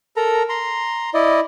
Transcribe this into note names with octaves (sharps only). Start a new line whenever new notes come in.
A4 A#4 A#5
A#5 C6
E4 D5 D#5